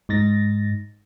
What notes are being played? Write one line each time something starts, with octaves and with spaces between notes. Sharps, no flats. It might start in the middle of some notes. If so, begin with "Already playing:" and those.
G#2 D#4 A6 A#6